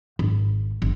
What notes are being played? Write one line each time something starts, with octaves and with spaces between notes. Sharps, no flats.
G#1
G1